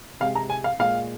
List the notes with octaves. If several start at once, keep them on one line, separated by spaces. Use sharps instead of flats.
C3 G#3 F5
A#5
G#5
F5
A#2 G#3 F5